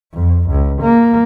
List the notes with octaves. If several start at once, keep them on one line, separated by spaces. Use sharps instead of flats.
F2
C#2
A#3